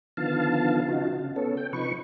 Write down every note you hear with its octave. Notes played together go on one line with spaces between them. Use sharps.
D3 D#3 F3 B3 F5 A5
C#3 D#4 F4 F#4
C#3
B3 C#4 A4
G5
C3 F3 D#4 B4 C#6